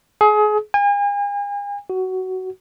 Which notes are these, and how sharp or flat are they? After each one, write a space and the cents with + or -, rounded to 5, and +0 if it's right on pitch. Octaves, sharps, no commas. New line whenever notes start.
G#4 +30
G#5 -40
F#4 +15